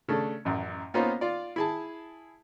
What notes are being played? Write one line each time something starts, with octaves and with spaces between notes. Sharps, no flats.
C#3 A3 D4
A1 F#2
A#3 B3 C#4 D#4 F4 C5
F4 D5
E4 G#4 A5